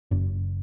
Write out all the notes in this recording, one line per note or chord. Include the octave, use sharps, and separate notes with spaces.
F#1